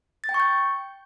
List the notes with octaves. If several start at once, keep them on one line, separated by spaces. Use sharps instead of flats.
A6
G5
C#6
G6